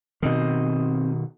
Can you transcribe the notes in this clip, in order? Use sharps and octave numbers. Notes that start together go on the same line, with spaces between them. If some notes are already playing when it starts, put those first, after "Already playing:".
B2 D#3 C4 C5 D#5